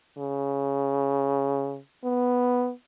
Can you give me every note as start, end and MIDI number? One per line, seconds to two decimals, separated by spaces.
0.18 1.78 49
2.04 2.71 59